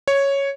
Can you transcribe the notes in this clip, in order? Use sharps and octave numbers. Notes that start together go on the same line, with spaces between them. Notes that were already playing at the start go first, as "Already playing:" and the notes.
C#5